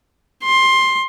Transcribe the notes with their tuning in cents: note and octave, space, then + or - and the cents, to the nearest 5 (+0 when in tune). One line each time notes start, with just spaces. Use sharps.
C6 +15